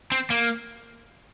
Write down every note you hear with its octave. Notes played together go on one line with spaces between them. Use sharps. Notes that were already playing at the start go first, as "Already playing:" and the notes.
C4
A#3